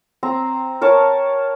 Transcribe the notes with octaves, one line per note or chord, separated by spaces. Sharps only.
C4 A#5
A#4 C#5 A5